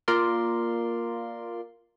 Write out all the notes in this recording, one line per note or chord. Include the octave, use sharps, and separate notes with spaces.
A#3 F4 A#4 D5 C6